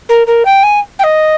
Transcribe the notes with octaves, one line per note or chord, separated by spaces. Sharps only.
A#4
A#4
G5
G#5
G5
D#5